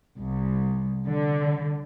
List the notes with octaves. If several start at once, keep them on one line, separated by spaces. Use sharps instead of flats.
C2
D3